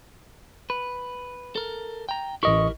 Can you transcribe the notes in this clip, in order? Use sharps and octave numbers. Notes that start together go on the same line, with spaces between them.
B4
A4 A#4
G5 A#5
A1 E4 G4 A#4 D#5 C#6